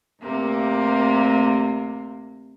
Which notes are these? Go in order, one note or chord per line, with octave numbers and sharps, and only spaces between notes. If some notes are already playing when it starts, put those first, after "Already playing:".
D2 C3 A#3